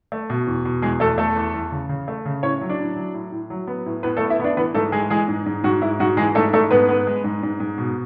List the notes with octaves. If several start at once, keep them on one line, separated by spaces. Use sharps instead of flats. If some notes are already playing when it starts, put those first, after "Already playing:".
A3
B2
E2
B2
E2 G#3 G#4
E2 A3 A4
A3 A4
E2
E2
C#3
C#3
A3
C#3
A2 C#4 C#5
F#3
D4 D5
A2
F#3
A2
A2
F#3
B3
A2
A2 B3 B4
A3 A4
B3
E4 E5
B3 D4 D5
E3 B3 B4
G#2 A3 A4
G#3 G#4
E3 G#3 G#4
G#2
G#2
G#2 F#4
G#2 E4
G#2 F#4
E3 G#3 G#4
G#2 A3 A4
G#2 A3 A4
G#2 B3 B4
B3
G#3
G#2
G#2
G#2
B2